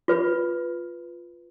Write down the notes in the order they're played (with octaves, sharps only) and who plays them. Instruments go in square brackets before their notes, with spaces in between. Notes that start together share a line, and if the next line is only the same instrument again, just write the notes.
[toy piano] F4 B4 B5